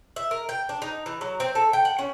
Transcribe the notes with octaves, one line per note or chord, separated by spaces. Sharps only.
E5
A#4
G5
D4
D#4
E3
F#3
C4
A4
G5
F#5
C#4